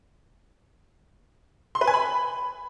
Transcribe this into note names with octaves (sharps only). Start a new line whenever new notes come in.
C6
B4
G#5
B5